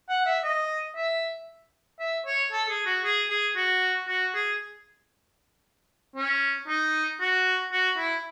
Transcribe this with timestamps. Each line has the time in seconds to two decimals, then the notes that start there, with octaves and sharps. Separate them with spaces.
0.09 F#5
0.26 E5
0.44 D#5
0.96 E5
1.99 E5
2.26 C#5
2.52 A4
2.69 G#4
2.86 F#4
3.04 G#4
3.30 G#4
3.56 F#4
4.08 F#4
4.34 G#4
6.16 C#4
6.68 D#4
7.20 F#4
7.72 F#4
7.97 E4